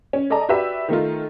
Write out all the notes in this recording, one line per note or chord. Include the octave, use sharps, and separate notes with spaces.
C#4
A4 D5 D#5 A5 A#5
F#4 G4 B4 D5 E5
D#3 A3 D#4 F4